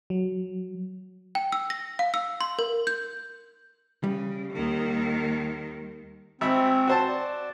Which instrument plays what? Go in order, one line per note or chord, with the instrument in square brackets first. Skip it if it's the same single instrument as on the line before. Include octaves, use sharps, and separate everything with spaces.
[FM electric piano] F#3
[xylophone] G5
E6
A#6
F5
E6
C6
A#4
G6
[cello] C#3 [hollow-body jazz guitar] G3
[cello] D#2 D#3
[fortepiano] G#1 E5 B5 [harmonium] C4
[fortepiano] F#4 C5 A5
[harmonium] D5